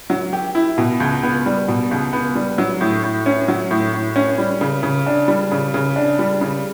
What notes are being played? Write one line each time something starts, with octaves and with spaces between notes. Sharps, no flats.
F#3
G4
E4
B2
C#2
B3
G3
B2
C#2
B3
G3
F#3
A2
A2
C#4
F#3
A2
A2
C#4
G3
C#3
C#3
D4
G3
C#3
C#3
D4
G3
C#3